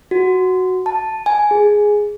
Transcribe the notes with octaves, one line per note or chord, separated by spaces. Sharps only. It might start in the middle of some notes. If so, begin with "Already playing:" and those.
F#4
A5
G#5
G#4